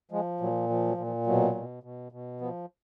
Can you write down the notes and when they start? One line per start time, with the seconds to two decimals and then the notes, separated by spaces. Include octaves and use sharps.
0.11 F3 G#3
0.40 A#2 F#3
0.69 F3
0.88 F#3
0.98 A#2
1.07 F3
1.27 B2 F#3
1.55 B2
1.83 B2
2.12 B2
2.41 F3 B3